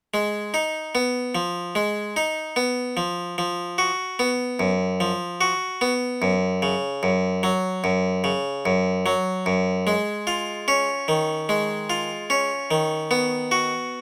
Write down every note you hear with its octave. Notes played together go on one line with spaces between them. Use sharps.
G#3
D#4
B3
F3
G#3
D#4
B3
F3
F3
F#4
B3
F#2
F3
F#4
B3
F#2
C#3
F#2
F#3
F#2
C#3
F#2
F#3
F#2
G#3
F4
C#4
D#3
G#3
F4
C#4
D#3
B3
F#4